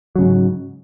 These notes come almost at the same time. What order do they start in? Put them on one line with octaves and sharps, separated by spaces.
F#3 C#3 G#2